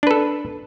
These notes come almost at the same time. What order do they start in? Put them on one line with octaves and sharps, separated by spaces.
D4 B4 A4